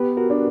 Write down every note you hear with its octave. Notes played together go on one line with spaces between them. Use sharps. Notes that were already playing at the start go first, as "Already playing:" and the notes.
Already playing: B3 G4 B4
F#4 A#4
D4